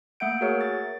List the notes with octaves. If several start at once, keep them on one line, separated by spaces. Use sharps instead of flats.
A3 A#3 E5 F#5 G6 D7
F#4 G#4 A#4 C#5 E5
A6